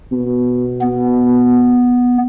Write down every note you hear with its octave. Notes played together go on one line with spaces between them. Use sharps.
B2
B3